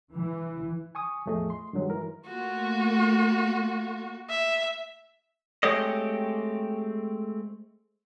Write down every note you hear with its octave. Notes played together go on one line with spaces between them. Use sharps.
E3
G#5 C#6 D#6
E2 A2 F3 A3 G#4 D#5
C6
G2 D#3 F#3 G#3
E3 A#4
A3 A#3 F4 F#4
E5
G#3 A3 C4 G4 C#5 D#5